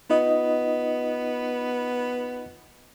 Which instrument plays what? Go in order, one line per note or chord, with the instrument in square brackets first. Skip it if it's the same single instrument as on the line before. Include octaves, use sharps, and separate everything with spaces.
[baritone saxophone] B3 [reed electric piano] D#4 F4 D#5